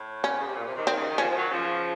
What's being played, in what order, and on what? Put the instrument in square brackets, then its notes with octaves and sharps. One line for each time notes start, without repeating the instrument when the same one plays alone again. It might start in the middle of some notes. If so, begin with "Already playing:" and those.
Already playing: [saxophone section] A2
[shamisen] C#4
[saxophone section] C#3
C3
A#2
C3
C3 D#3
[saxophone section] C3 [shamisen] C4
[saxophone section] C#3
D#3
[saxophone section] C#3 F3 [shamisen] C#4
[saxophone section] F3
D#3 F#3
C#3 F3